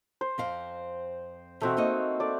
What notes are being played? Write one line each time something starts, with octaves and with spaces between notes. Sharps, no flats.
C5
F2 C4 F5
B2 E3 A3 C4 F#4
A#3 D#4 D#5
A3 D5